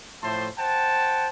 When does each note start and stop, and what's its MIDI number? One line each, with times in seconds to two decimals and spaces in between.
0.22 0.48 45
0.22 0.48 53
0.22 0.48 57
0.22 0.48 72
0.22 0.48 81
0.22 0.48 84
0.58 1.29 72
0.58 1.29 78
0.58 1.29 79
0.58 1.29 81